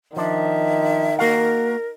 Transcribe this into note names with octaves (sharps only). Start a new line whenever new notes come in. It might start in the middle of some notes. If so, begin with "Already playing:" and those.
D#3 F3 D4 E5
A#3 F#4 A#4 F5